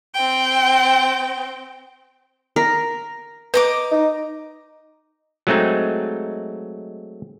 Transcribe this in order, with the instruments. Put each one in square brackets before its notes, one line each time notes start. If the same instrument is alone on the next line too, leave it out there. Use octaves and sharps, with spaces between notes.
[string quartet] C4 G5
[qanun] A#4
[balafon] B4 [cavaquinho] D#5 A#5 D6
[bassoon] D#4
[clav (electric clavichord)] F#3 G#3 A3 C4 D#4